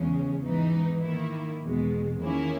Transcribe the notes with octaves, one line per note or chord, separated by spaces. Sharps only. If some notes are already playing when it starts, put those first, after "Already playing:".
Already playing: E2 C#3 G#3 C#4
G#2 E3 B3 D#4
D#3 A#3 E4
E2 B2 G#3
D#3 A#3 C#4 E4